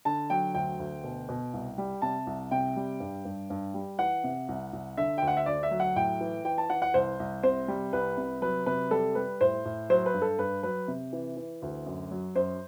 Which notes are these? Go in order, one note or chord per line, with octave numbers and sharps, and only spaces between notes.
D3 A5
F#3 G5
D2 G5
D2
B2
B2
C2
G3
C3 A5
C2
C3 G5
G3
G2
G2
G2
G3
E3 F#5
C3
C2
C2
D3 E5
D2 G5
F#5
E5
D2 D5
E5
F#3
F#5
A2 G5
E3
E3 G5
A5
E3 F#5
F#5
C2 C5
C2
C3 C5
G3
C2 B4
C3
F#3 B4
C3 B4
G3 A4
G3 B4
A2 C5
A2
F#3 C5
B4
G2
A4
G2 B4
F#3 B4
C3
E3
E3
D2
F#2
F#3
F#2 C5